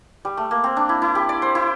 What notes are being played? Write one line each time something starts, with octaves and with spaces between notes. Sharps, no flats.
G3
A3
A#3
C4
D4
E4
E4
G4
D5
C5
E4